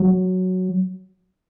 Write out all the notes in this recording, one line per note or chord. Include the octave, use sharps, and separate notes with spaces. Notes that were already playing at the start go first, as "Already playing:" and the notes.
Already playing: F#3